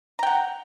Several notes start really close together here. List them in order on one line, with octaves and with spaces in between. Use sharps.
A#5 G5 F#5